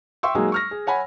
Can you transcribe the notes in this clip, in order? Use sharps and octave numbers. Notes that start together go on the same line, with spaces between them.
E5 G5 C6 C#6 E6
F#3 G#3 A#3 D#4 G#4
C#6 F6 A#6
G#4
C#5 F#5 G#5 B5